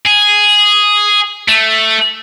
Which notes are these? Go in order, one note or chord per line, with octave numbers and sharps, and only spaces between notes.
G#4
A3